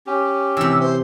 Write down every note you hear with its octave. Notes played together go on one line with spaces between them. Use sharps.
C#4 G4
C3 E3 E6
C5